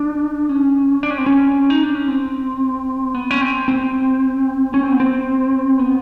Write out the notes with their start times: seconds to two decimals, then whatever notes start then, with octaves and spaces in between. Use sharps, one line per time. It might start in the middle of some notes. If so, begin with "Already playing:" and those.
Already playing: D4
0.49 C#4
1.03 D4
1.10 C#4
1.18 C4
1.26 C#4
1.70 D#4
1.83 D4
1.95 C#4
2.08 C4
3.14 B3
3.31 C#4
3.41 C4
3.68 C4
4.74 C#4
4.83 C4
4.92 B3
5.00 C4
5.79 B3